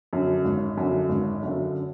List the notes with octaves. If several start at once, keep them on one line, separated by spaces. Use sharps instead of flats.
F#2 D3
G#1
F#2 D3
G#1
F#2 D3